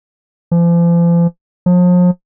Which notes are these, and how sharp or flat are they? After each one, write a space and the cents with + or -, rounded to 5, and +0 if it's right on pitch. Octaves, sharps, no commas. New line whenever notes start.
F3 -40
F3 +40